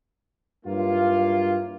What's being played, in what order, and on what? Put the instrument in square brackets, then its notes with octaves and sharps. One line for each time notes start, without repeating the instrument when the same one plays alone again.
[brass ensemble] G2 F#3 A#3 E4 F4